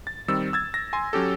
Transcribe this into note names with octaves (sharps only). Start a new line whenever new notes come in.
A6
D#3 G3 C4 E6
E6 G#6 A6
A#6
G#5 C6
F#3 C#4 G4 A4